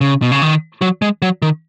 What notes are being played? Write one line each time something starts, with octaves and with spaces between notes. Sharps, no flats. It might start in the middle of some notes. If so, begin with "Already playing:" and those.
C#3
B2
C#3
D#3
F#3
G#3
F#3
D#3